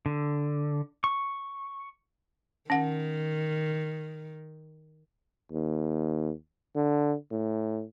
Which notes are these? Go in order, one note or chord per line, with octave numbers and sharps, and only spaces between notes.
D3
C#6
D#3 C#4 F#5
D#2
D3
A2